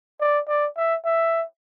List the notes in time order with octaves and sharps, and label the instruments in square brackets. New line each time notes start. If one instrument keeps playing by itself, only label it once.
[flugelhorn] D5
D5
E5
E5